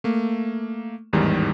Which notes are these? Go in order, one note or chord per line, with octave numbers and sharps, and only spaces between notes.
A3 A#3
A1 E2 G#2 D#3 G3